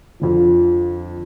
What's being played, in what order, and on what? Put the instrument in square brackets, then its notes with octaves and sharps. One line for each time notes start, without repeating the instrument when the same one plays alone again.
[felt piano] F2 D3 F3